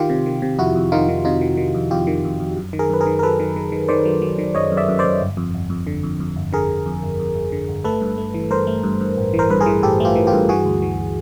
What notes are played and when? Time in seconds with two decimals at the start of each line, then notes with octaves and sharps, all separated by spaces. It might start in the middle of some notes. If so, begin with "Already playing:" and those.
Already playing: D#3 F4 G4
0.10 C3
0.26 D#3
0.42 C3
0.59 F2 E4 F#4
0.75 F2
0.92 D#3 D#4 F4
1.09 D#3
1.25 C3 D#4 F4
1.41 D#3
1.57 D#3
1.74 F2
1.91 F2 F4 G4
2.07 D#3
2.24 F2
2.40 F2
2.57 F#2
2.73 D#3
2.79 G#4 A#4
2.90 F#2 B4
3.01 G#4 A#4
3.06 D#3
3.19 A#4
3.23 F#3 A4 B4
3.40 D#3
3.56 D#3
3.72 D#3
3.88 D#3 C5 D5
4.05 F#3
4.22 F#3
4.38 D#3
4.55 F#2 C#5 D#5
4.72 F#2
4.77 D5 E5
4.88 F#2
4.99 C5 D5
5.04 F#2
5.21 G1
5.37 F2
5.55 G1
5.70 F2
5.87 D3
6.03 F2
6.20 F2
6.36 G1
6.53 D3 G#4 A#4
6.69 G1
6.86 F2
7.03 G1
7.20 F2
7.35 G1
7.52 D3
7.69 G1
7.84 A3 A4 B4
8.02 G2
8.18 A3
8.34 E3
8.51 G2 A#4 C5
8.67 A3
8.83 G2
9.01 G2
9.17 A1
9.34 E3
9.39 A#4 C5
9.50 G2 B4
9.61 G#4 A#4
9.66 E3
9.83 A1 G4 A4
10.00 A3 F4 G4
10.16 E3
10.27 F4 G4
10.33 G2
10.49 E3 F#4 G#4
10.65 D2
10.82 E3